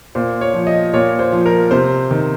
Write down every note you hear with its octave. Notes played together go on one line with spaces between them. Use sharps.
A#2 C5
C#5
F3
D#5
A#2 C#5
C5
F3
A#4
C3 C5
D#3